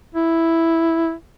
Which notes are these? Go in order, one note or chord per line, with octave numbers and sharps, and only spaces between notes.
E4